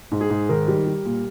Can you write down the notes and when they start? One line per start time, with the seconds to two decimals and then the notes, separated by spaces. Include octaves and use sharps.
0.12 G#2
0.21 G#4
0.30 G#2
0.49 D#3 A#4
0.68 G3
0.86 G3
1.05 A#2